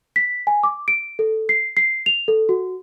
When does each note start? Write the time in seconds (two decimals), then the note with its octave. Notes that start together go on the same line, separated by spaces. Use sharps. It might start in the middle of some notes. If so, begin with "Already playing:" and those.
0.16 B6
0.47 G#5
0.63 D6
0.88 D7
1.19 A4
1.49 C7
1.77 C7
2.06 F7
2.28 A4
2.49 F#4